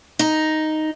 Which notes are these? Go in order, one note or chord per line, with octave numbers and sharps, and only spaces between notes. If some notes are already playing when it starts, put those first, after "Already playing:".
D#4